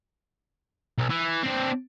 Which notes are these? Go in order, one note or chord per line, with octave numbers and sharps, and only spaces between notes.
B1
E3
C4 D4